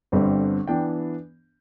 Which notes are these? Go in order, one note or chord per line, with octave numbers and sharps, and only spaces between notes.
G1 G2 D3 G3 C4
E3 B3 D4 G5